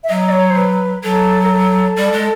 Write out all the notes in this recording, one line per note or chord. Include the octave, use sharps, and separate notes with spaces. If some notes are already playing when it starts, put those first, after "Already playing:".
E5
F#3 D#5
D5
C#5
C5
B4
F#3 A4
A#4
A4
G3
G#3